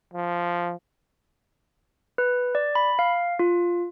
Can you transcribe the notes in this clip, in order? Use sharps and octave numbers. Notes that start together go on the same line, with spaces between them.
F3
B4
D5
B5
F5
F4